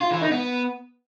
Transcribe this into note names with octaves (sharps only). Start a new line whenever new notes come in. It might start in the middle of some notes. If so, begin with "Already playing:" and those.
F4
E3
D#4
B3